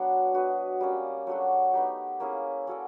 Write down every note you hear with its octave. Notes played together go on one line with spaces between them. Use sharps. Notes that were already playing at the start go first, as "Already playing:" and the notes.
Already playing: F#3 B3 D4 F#4
D4 F#4 B4 D#5
G3 A#3 C#4
F#3 A3 D4 F#4
B3 D#4 G4
A#3 C#4 E4 G#4
C#4 F#4 A4 D5